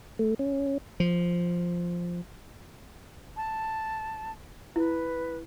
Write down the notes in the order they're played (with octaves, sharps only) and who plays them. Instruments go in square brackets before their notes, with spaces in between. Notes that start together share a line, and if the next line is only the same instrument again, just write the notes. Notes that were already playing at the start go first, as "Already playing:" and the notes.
[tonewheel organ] A3
C#4
[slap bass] F3
[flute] A5
[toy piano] E4 [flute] B4